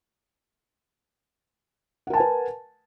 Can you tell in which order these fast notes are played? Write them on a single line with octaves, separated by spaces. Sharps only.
F#5 A#4 A5 G#5 B4